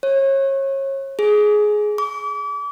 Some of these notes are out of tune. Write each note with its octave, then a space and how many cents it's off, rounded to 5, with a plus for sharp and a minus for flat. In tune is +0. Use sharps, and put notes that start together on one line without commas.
C#5 -30
G#4 +15
D6 -35